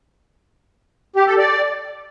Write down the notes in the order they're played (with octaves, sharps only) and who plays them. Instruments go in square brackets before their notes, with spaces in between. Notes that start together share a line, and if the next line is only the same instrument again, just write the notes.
[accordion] G4
A4
D5